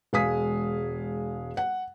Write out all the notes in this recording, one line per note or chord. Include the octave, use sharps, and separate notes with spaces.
E1 G#3 F5 G#5 D#6 B6
F#5